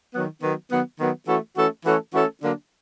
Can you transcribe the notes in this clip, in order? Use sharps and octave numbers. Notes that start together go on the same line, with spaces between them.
D#3 F#3 B3
D#3 F#3 B3
D#3 F#3 B3
D#3 F#3 B3
E3 A3 C#4 F#4 A4
E3 A3 C#4 F#4 A4
E3 A3 C#4 F#4 A4
E3 A3 C#4 F#4 A4
D3 F#3 A#3 D4